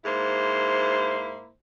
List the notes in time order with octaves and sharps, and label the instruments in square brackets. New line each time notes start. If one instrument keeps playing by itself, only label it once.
[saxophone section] G#2 A#3 E4 C5